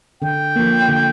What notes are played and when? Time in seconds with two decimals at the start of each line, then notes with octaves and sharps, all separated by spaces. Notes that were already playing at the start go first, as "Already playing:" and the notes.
0.22 D3 G5
0.56 F3 A#3
0.89 D3